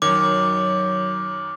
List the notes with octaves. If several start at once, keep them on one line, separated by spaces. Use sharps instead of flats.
F#2 D#3 F#3 C#5 D6